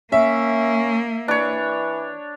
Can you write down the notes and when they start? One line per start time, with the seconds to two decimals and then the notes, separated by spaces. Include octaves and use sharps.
0.12 A#3 C#4 E5
1.28 E3 D4 C#5